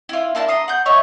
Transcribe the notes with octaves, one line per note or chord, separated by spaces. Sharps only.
E4 F4
A#3 D4 E4 A5
A#5 C6 D#6
F#5 G6
C#5 D#5 E5 C#6